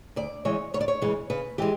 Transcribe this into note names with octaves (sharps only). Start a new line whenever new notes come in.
D2 D5
C#3 E3 G#3 C#5
D2 C#5
D5
C#5
C#3 E3 G#3
C#3 B4
E3 G#3 G4